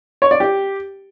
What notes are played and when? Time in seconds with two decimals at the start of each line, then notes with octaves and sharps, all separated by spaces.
0.22 C#5
0.31 D5
0.40 G4